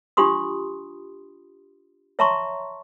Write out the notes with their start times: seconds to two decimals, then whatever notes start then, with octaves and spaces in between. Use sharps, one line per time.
0.17 D4 F4 G4 B5 C6 D#6
2.19 C#5 E5 A5 A#5 C6 C#6